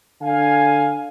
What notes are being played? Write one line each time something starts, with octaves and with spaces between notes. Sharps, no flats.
D3 F5 G#5